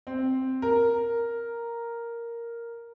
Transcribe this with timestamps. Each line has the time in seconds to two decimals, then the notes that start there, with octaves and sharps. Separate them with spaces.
0.07 C4
0.62 A#4